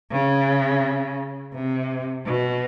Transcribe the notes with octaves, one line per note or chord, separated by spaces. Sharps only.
C#3
C3
B2